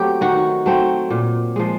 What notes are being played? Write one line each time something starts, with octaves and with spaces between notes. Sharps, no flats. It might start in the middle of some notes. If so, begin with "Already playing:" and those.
Already playing: F#3 A3 C4 G4
D#3 F#4
F#3 A3 C4
A#2
F3 G#3